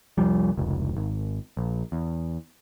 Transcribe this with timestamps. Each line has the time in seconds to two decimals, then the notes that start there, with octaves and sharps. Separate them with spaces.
0.18 C2 F2 F3 G3
0.57 F1 C#2
0.97 G#1
1.57 A#1
1.92 E2